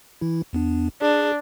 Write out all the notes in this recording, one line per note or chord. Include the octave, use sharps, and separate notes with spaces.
E3 E4
E2 B3 D4
D4 G#4